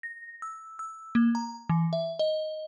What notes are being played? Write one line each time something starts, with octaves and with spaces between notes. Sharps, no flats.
A#6
E6
E6
A#3
A#5
E3
E5
D#5